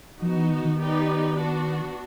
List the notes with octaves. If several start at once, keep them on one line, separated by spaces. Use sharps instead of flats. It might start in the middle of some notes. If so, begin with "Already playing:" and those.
F3 B3 D#4 F#4
E3
D#3
D#3
B3 D#4 G4 B4 D5
B3 D4 F#4